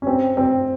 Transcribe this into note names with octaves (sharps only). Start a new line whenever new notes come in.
C#4
C4
C4